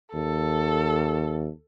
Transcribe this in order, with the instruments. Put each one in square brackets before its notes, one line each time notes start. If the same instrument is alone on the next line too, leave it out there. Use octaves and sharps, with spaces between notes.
[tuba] D#2 [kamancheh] A4